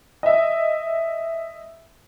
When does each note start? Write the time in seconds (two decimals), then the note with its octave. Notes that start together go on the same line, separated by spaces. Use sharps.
0.23 D#5 E5